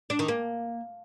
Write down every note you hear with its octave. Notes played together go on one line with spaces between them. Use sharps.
D4
D#3
A#3